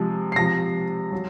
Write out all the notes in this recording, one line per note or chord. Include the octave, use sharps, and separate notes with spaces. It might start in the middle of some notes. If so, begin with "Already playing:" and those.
Already playing: C3 F3 G#3
C7
C3 F3 G#3 A#6
F#3